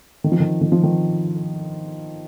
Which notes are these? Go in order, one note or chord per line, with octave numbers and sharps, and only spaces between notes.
D#3
F3
D#3
D#3
F3
D#3